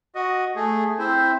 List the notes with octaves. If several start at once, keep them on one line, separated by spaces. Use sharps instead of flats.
F#4 D#5
A3 G#4
C4 E4 C5